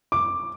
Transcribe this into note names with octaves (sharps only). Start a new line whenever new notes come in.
D6